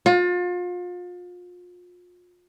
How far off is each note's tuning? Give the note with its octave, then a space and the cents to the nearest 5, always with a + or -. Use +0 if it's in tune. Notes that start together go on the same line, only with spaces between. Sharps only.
F4 +35